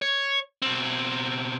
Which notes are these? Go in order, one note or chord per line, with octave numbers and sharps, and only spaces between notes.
C#5
B2 C4